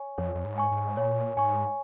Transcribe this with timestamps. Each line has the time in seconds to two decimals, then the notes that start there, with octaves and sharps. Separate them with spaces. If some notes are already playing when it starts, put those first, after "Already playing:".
Already playing: C#5 G#5 C#6
0.18 F2 C#5
0.35 F2
0.45 G#2
0.58 G#5 C#6
0.71 G#2
0.97 A#2 C#5
1.37 G#2 G#5 C#6